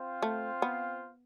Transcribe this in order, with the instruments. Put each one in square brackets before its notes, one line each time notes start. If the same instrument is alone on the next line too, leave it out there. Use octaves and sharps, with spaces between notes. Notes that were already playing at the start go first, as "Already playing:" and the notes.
Already playing: [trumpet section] C4 F4 C5 F5
[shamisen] A3
B3